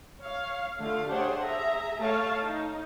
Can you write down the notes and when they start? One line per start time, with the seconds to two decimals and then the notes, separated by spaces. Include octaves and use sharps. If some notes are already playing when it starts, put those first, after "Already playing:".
0.20 C#5 F5
0.80 D3 A3 F4 F5
1.09 D4 G4 G#4 C5 C#5 F#5
1.40 G#4 E5 A#5
1.99 A3 C#5 F5 A5
2.42 D#4